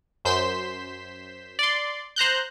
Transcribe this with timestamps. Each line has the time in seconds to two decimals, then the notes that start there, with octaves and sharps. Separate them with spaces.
0.25 F#2 C5 G6 B6 C7 E7
1.59 D5 C6
2.16 C5 A#5 F#6 G6